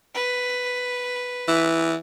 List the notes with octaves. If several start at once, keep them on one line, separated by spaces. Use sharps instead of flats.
B4
E3